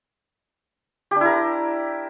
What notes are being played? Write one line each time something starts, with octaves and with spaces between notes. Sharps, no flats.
D4 E4 G4 A#4